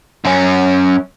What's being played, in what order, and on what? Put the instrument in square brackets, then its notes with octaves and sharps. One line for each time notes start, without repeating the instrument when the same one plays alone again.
[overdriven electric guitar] F#2 C#4